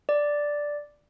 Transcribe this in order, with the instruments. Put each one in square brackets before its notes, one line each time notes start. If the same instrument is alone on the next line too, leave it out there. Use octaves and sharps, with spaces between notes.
[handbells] D5